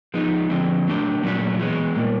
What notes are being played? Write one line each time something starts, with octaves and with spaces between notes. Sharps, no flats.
F3 G#3 B3 D#4
D3 F3 G#3 C4
F#3 A3 D4 G4
A#2 F#3 A3 C#4 F#4
E3 G#3 B3
A#2 G3 A#3